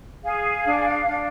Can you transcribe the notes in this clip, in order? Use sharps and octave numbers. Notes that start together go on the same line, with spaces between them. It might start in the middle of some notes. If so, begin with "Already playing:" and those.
G#4 F5
D4
D4